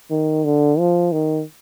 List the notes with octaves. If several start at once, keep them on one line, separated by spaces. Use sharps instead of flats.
D#3
D3
F3
D#3